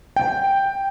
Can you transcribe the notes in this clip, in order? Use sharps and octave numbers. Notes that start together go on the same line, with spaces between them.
G5